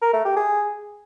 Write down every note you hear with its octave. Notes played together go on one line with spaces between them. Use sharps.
A#4
A3
G4
G#4